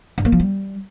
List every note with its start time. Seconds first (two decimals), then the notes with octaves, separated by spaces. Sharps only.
0.18 G2
0.25 A#3
0.32 F3
0.40 G3